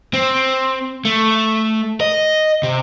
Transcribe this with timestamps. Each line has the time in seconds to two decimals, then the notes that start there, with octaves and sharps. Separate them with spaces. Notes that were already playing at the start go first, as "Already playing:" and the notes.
0.13 C4
1.05 A3
2.01 D#5
2.63 C3